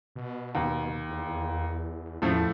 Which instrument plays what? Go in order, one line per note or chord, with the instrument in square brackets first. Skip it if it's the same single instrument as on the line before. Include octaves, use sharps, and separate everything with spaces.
[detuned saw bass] B2
[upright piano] D#2
[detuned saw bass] E2
[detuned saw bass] E2 [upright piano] A2 F3 A3